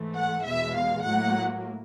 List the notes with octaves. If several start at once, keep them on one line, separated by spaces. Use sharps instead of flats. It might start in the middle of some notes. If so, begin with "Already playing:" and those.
Already playing: G#2 E3 A3
F#5
E2 B2 G#3 E5
F5
A2 F#3 A#3 F#5